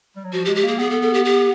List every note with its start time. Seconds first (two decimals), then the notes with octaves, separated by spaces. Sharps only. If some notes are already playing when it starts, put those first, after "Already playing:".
0.16 G3
0.25 F#3
0.33 F3 F#4
0.45 G4
0.48 G#3
0.56 G4
0.63 A#3 G#4
0.79 B3 G#4
0.90 A4
1.02 A4
1.14 G4
1.25 G4